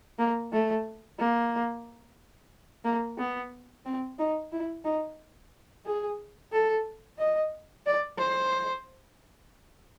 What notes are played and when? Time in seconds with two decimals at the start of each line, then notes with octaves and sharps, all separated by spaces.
0.19 A#3
0.52 A3
1.19 A#3
2.85 A#3
3.18 B3
3.86 C4
4.19 D#4
4.52 E4
4.85 D#4
5.86 G#4
6.52 A4
7.18 D#5
7.86 D5
8.18 C5